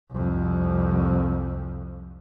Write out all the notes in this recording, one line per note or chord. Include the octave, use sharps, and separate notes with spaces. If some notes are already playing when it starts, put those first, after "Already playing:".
C2 F2